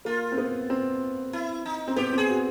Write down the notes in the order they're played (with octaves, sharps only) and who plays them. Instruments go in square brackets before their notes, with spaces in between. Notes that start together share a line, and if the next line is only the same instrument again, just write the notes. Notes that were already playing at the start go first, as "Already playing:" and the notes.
[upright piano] A#3 [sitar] F4
[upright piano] C4
B3
C4
[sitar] E4
D#4
[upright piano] C4
[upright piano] B3 [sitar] G4
[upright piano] C4 [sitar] G#4
[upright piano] F#4